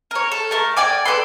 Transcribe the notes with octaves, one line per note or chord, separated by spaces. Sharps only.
A#4 C#5
A4
A3 A#4 A5
D5 G5 G#5 D6
A4 B4 D5 C6